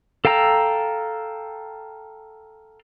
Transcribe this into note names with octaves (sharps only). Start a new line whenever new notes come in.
A4 F5 G5 A#5 E6